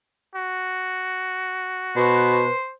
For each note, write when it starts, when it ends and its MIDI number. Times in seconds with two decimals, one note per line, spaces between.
0.36 2.48 66
1.96 2.49 47
1.96 2.50 71
1.96 2.71 72